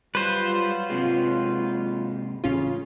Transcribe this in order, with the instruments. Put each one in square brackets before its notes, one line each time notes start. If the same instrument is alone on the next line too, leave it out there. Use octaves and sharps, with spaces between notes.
[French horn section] F#3 F4 [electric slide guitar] G3 [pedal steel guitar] B4 C5
[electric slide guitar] G#2 C3 G#3
[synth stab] A1 C#4 F4 [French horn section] C#3